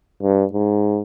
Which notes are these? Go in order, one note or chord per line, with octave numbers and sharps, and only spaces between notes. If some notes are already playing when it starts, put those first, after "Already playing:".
G2
G#2